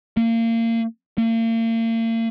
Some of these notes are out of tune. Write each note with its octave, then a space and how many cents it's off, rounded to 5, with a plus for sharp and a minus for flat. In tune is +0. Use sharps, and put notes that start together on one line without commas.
A#3 -30
A#3 -40